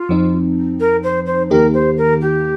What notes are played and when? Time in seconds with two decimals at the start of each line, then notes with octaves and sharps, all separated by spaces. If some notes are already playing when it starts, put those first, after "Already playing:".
Already playing: F4
0.09 F2 F3 C4 D#4
0.80 A#4
1.03 C5
1.26 C5
1.50 D#2 D#3 A#3 D#4 G4 A#4
1.74 C5
1.98 A#4
2.21 G4